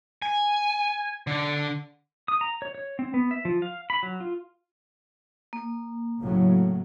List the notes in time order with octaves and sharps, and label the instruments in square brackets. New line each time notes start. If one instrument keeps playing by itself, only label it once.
[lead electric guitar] G#5
D3
[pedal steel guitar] D#6
A#5
C#5
C#5
C4
B3
E5
F3
F5
B5
F#3
F4
[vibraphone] A#3
[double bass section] A2 C#3 F#3